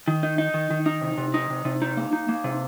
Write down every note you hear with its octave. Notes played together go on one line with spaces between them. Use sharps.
D#3
D#4
D#4
D#3
D#3
D#4
C3
C3
D#4
C3
C3
D#4
A#3
D#4
A#3
C3